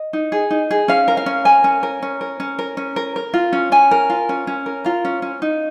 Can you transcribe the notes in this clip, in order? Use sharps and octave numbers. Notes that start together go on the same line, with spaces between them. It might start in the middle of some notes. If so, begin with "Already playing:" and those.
Already playing: D#5
D#4
G#4
D#4
G#4
C#4 F5
A#4
F5
C#4
A#4 G#5
C#4
A#4
C#4
A#4
C#4
A#4
C#4
A#4
A#4
F4
C#4
C#4 G#5
A#4
F4
C#4
C#4
A#4
F4 A#5
C#4
C#4
D#4